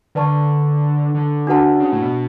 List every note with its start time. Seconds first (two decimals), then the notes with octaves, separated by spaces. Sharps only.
0.15 D3 B4 D5 A5 C#6
1.14 D3
1.47 D4 F#4 B4 F#5 A5
1.80 C#3
1.92 A2
2.02 B2